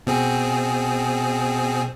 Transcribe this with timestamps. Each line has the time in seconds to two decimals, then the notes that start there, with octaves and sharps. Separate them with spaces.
0.07 B2 C4 G#4